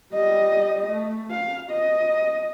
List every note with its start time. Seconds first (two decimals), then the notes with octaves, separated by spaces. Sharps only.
0.13 G3 D#5
0.90 A3
1.31 F5
1.71 D#5